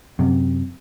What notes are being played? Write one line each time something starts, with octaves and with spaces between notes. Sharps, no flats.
F#2 C3